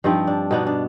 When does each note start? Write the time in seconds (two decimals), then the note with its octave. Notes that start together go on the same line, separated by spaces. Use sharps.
0.04 G2 F3 C4 D#4
0.27 D4
0.51 B2 B3 D4 D#4
0.67 D4